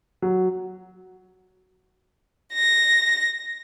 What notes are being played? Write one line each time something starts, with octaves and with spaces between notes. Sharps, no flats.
F#3
A#6